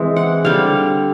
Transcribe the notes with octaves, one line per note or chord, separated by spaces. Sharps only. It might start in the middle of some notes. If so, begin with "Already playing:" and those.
Already playing: E3 G#3 C4
F#5
D3 G3 C4 F5